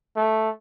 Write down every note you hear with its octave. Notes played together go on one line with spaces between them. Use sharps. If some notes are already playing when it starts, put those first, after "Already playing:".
A3